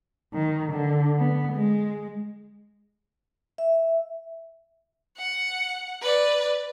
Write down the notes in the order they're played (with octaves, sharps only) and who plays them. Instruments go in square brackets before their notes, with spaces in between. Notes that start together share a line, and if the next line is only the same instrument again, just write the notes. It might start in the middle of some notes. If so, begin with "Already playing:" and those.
[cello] D#3
D3
B3
G#3
[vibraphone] E5
[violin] F#5
B4 D5